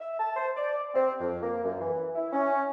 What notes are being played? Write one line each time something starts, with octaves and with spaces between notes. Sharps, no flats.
E5
A5
C5
D5
C4
F2
A#3
F#2
E3
E4
C#4